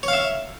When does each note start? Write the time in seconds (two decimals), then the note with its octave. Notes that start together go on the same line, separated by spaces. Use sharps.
0.03 C#5
0.08 F5
0.13 E5